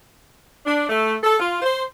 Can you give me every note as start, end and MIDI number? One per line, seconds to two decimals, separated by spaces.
0.66 0.87 62
0.89 1.16 57
1.23 1.35 69
1.39 1.59 65
1.62 1.84 72